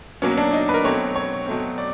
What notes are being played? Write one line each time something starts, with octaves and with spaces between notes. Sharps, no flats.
B2 F#3 A#3 C#4
D4
D#4
B4
A#4
B2 F#3 A3 C4 C#5
C#5
B2 F#3 A3 C4
D5